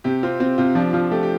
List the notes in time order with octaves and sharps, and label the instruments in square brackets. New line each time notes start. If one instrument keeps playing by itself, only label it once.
[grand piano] C3 [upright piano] G4
[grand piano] C4 [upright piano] F4
[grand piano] C4 [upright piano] F4
[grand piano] C3 [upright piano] F4
[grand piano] F3 [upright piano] D4
[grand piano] F3 [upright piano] F4
[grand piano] A3 [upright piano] G4
[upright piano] G4